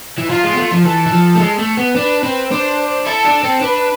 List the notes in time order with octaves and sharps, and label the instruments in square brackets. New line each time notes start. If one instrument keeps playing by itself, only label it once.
[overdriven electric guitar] E3
[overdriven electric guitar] F3 [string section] F4
[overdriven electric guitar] G#3
B3
A3
F3
[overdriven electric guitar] E3 [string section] A4
[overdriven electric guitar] E3
F3
A3
G#3
A3
B3
[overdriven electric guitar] D4 [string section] B4
[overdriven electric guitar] C4
[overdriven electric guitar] D4 [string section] C5
[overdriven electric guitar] E4 [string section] A4
[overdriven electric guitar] D4
C4
[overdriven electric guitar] D4 [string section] B4